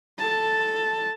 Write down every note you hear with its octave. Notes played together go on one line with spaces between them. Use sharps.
A4 A5